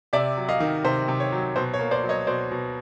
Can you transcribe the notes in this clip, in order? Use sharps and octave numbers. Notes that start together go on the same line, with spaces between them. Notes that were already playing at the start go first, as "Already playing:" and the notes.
C3 D5 E5
F#3
D#5 F5
D#3
C3 C5
C3
C#5
F#3
B2 C5
C#5
A#3
C5 D5
F#3
C#5 D#5
B2 C5 D5
B2